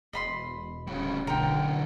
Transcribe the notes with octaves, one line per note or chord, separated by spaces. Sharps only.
E1 D#5 B5 C6
D1 C#3 G3 F#4
B1 D3 E3 A#4 G5